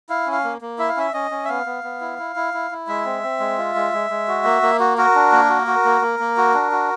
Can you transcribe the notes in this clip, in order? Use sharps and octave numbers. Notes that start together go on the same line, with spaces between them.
E4 F5
C#4
F5
A#3
A#3
E4 E5
F5
C#4 E5
C#4 D#5
C#4
E5
B3 F5
B3
B3
E4
E4
E4
E4
E4
G#3 E5
C4
C4
G#3
F4
G#3
G#3
G#3
F#4
A#3
A#3
F#4
F#4 A#4
D4
A#3
F#4
F#4
A#3
A#3
A#3
F#4
D4
F#4